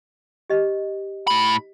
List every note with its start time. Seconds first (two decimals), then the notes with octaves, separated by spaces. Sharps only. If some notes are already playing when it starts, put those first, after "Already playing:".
0.50 G4 D#5
1.27 A2 B5